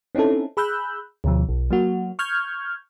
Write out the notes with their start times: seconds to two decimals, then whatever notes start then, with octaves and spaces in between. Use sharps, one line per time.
0.15 C4 C#4 D#4 E4 A4
0.57 G#4 B5 E6 F#6 G6
1.24 D2 B2 F3
1.49 B1
1.71 F#3 A#3 F#4
2.19 C#6 F6 G6 G#6